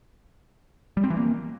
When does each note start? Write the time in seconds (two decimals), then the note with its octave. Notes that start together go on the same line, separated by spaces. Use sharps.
0.97 G3
1.04 C4
1.10 E3
1.17 A#3